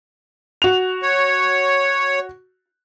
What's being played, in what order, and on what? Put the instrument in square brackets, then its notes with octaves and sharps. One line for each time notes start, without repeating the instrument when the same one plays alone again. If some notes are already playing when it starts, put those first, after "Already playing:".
[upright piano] F#4 F7
[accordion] C#5